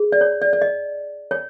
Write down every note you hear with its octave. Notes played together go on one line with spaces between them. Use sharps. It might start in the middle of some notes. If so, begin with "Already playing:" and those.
Already playing: G#4
D5
C#5
D5
D5
D#5
C#5